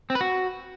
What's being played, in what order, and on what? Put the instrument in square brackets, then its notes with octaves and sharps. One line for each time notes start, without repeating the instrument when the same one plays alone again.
[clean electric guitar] C4
B4
F#4